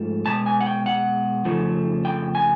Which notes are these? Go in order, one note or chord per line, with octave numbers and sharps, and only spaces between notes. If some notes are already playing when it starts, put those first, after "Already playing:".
Already playing: G#2 F3 A3
B2 G#3 A5
G#5
F#5
G5
F#5
F2 C#3 F3 A3
G5
G#5